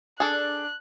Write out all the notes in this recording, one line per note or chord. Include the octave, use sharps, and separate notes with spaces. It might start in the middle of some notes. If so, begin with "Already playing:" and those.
D4 G#4 A4 F#6